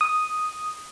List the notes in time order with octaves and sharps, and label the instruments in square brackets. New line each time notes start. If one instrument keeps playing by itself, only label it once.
[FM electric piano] D#6